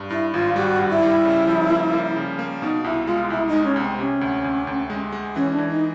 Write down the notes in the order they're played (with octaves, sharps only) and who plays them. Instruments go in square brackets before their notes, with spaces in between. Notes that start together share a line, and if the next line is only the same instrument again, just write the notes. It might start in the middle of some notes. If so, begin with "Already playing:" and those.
Already playing: [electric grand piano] G2
[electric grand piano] G2 [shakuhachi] E4
[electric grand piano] G#1 [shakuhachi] F4
[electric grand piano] G3 [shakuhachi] F#4
[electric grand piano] G2
[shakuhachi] E4
[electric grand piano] G3
C#3
F3
A#3
A#3
C#3
A#3
[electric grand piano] B2 [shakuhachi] D#4
[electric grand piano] C2 [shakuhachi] E4
[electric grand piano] G#3 [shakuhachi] F4
[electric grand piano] C2 [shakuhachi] E4
[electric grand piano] G#3 [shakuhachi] D#4
[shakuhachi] C#4
[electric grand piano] C2
[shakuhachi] C4
[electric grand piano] C3 [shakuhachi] C#4
[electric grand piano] D2
D2
D2
G#3
G#3
[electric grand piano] E3 [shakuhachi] C#4
[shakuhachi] D4
[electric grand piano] E3
[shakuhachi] D#4